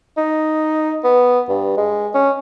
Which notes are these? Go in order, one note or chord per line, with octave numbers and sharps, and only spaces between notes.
D#4
B3
G2
G#3
C#4